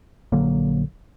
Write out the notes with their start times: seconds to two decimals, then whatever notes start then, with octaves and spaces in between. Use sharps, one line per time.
0.32 A#1 D3 F#3 A#3